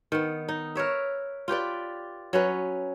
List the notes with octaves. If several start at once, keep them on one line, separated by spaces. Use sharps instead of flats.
D#3 B3
D#4
A#4 B4 C#5 E5
F4 G4 B4 D5
F#3 C#4 B4